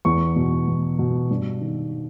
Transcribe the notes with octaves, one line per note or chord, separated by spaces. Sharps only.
E2 C#6
B2
E2
B2
G2
D#3